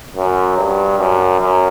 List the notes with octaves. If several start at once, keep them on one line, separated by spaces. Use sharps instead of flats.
F#2
G2
F#2
F#2